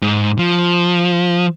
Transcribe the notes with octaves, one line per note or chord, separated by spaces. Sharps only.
G#2
F3